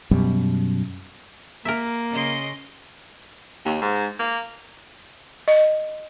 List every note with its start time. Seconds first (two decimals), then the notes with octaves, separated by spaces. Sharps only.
0.11 F#2 B2 G3
1.65 A#3 A#4 E5
2.11 C#3 D#5 C6
3.64 D#2
3.79 G#2
4.19 A#3
5.48 D#5